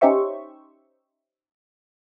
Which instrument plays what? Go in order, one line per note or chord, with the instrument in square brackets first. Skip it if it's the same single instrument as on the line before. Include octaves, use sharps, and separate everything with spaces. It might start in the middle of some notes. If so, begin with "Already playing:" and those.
[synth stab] C#4 D#4 G4 C5 E5 C#6